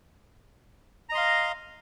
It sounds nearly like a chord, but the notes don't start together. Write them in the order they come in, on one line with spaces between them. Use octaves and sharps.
A#5 D#5 C6 F5